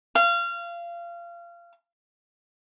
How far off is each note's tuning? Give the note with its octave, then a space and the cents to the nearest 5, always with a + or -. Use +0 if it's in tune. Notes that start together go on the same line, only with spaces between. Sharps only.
F5 -25